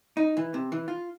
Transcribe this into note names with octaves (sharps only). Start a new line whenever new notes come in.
D#4
E3
C3
E3
F4